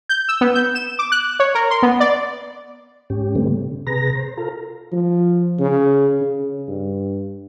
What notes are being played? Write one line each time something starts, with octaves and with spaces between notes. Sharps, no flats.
G6
E6
B3
G6
E7
D6
F#6
C#5
A#4
C6
B3
D5
G#2 C#4 G4
D3 G3 A3 B3 C4
C#3
C3 G#4 B4 A#5 A#6
C5
F4 A4 A#4 A#5
F3
C#3
C#3
G2